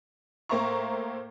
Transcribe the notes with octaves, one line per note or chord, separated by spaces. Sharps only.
A2 A#3 C5 E5 A#5 C#6